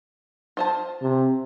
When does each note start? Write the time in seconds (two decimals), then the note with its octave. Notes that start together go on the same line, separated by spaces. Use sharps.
0.57 F4 C5 A5
1.02 C3